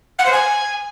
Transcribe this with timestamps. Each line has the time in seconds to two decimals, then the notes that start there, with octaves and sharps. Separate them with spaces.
0.18 F#5
0.25 C5
0.32 G#5